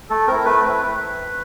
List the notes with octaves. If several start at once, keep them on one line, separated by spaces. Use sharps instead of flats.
A3 A4
C4 E4 A#4
A3 B4
C4 E4